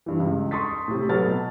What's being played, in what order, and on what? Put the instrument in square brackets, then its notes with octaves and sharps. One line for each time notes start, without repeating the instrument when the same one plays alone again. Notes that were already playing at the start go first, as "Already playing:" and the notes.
[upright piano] G2 E3
C#2
C6 C#6 D#6 A6 B6
A2 C3
F#3 A4 B4 F6 A6
B2